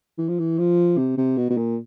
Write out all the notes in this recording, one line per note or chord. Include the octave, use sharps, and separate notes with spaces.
E3
F3
E3
F3
C3
C3
B2
B2
A#2